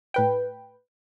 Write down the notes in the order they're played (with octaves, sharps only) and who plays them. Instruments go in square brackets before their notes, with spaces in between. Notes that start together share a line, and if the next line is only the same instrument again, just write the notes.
[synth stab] A2 B4 G5